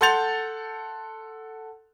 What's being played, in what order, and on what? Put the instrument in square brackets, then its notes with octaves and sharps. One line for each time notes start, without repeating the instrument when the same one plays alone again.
[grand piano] A4 F#5 C6 G6 A6 F7